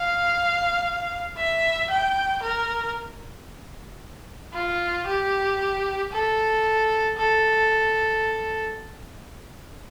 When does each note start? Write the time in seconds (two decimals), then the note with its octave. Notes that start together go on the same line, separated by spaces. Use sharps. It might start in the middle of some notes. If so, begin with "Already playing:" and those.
Already playing: F5
1.37 E5
1.90 G5
2.42 A#4
4.53 F4
5.06 G4
6.12 A4
7.17 A4